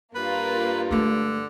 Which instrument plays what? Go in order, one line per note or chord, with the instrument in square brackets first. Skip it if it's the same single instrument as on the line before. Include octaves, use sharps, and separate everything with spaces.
[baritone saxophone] G2 [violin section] A#3 F4 [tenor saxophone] B4
[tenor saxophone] D3 [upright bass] G#3 A3